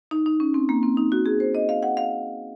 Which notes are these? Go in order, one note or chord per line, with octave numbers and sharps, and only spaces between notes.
D#4
D#4
C#4
C4
A#3
C4
D#4
F#4
G#4
C5
D#5
F5
F#5
F5